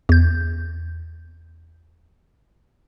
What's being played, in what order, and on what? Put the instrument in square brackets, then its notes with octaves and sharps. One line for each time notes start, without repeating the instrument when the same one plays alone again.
[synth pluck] E2 G6